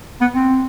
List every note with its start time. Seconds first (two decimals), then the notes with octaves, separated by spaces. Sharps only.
0.21 B3
0.35 C4